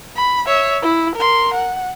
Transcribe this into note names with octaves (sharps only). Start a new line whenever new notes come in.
B5
C#5 E5
E4
A#4 C6
F#5